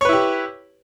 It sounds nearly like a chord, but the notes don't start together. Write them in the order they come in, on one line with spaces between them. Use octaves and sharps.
C#5 B4 E4 G4